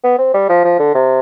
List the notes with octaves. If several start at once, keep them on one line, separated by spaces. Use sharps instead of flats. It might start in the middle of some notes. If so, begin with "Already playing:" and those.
B3
C4
G3
F3
F3
D3
C3